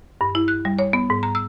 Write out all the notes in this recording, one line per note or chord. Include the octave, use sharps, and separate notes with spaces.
G2
E4
F#6
G3
C#5
B3
G#2
A#5
E6